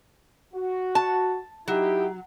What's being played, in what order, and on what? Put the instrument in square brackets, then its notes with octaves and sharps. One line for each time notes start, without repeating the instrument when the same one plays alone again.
[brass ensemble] F#4
[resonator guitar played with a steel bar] A5
[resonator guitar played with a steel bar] F#3 [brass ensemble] D#4 E4 G4